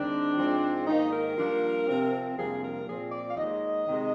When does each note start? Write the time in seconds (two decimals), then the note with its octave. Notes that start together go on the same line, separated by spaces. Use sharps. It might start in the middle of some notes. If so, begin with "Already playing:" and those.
Already playing: D#2 D#3 G#3 C4 D4
0.36 G#2 F3 G#3 C4
0.86 G#2 D#3 A#3 D#4
1.11 A#4
1.37 G2 F3 A#3 D4
1.87 C3 F3 C4
2.36 F2 C3 G3 A#3 D4 G#4
2.61 A#4
2.86 A#2 F3 C4 G#4
3.11 D5
3.27 F5
3.37 D#2 D#3 G#3 D#5
3.87 C3 D#3 G#3